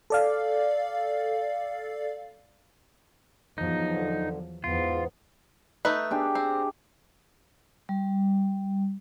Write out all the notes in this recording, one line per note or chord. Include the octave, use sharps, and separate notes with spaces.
A4 D5 F5
E2 F3 F#3 D#4
D3
E2 G#2 E3 B3 F4
A3 D#4 B4 E5
D4 G4 G#4
C4
G3